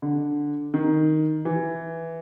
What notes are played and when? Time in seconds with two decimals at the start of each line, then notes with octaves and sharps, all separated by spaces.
0.02 D3
0.74 D#3
1.45 E3